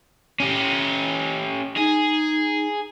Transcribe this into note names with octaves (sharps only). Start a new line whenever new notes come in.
C#4 G4
D#4 G#4